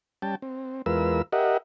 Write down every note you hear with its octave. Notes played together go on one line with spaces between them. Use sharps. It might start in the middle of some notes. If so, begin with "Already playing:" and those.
G3 C#4 G5 A5
C4
E2 G#3 F4 A#4 B4 E6
G4 A#4 D#5 E5 F#5